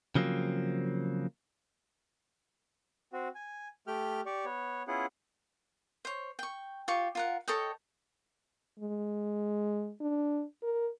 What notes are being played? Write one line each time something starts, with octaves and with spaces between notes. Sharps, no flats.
C#3 F3 F#3 A#3 C4
C4 F#4
G#5
A3 G4 G5 F6
G4 D5 C#6
B3 C#5
B3 C#4 E4 F4 G#4 F#5
C5 C#5
G5 C#6
F4 G4 C#6
F4 A#4 F#5
A4 C#5 D#5 G5
G#3
D4
A#4